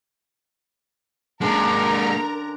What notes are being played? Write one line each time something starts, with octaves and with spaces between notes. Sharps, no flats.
D3 G#3 A#3 C#4 D4 A#4 A#5